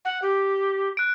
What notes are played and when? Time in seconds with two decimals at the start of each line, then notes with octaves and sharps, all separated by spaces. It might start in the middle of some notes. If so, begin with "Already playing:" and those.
0.05 F#5
0.22 G4
0.97 F#6 D7